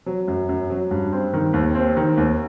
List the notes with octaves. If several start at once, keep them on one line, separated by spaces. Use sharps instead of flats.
F#3
F#2
F#2
F#3
G2
C4
D#3
D#2
C4
D#3
D#2